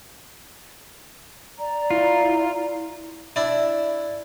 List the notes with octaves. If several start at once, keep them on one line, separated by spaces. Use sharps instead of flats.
D5 A#5
E4 F4
D4 E4